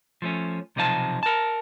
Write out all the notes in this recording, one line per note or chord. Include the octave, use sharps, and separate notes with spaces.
F3 A3 C#4
B1 C3 F3 D#4 F5 A5
A#4 A5